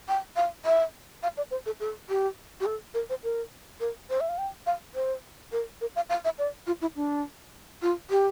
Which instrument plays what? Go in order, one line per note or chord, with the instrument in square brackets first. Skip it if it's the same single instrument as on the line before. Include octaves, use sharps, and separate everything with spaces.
[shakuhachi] G5
F5
E5
F5
D5
C5
A4
A4
G4
G4
A4
A#4
C5
A#4
A#4
C5
E5
F5
G5
F5
C5
A#4
A#4
F5
F5
E5
D5
F4
E4
D4
F4
G4